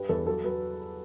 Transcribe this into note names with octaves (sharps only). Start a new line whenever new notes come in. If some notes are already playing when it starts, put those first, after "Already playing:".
Already playing: G2 G3 B4
E2 A4
F#3 A4
F#3 B4